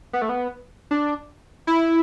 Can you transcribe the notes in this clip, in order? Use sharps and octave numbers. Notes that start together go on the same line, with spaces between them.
B3
A3
B3
D4
E4